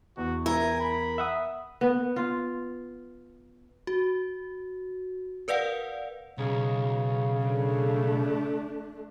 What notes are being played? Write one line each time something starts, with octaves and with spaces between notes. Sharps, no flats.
E2 F#4
E4 A#4 G#5
B5
E5 F#5 D#6
B3
F4
F#4
A#4 B4 D5 F5 F#5
B1 C#3
A3 D4